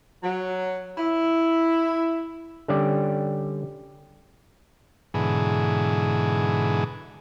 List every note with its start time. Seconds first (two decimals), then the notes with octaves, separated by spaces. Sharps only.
0.23 F#3
0.98 E4
2.68 D3 G3 C#4 G4 D5
5.14 G#2 B2 D3 E3 G#4